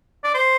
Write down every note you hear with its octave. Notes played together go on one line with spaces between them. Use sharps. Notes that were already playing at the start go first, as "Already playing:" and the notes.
D5
C5